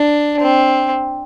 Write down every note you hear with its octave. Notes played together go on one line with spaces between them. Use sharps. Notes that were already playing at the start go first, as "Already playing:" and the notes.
Already playing: D4
C4